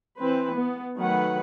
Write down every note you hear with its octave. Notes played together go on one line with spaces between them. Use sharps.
E3 C4 B4
B3
D#3 F#3 A3 B4 F#5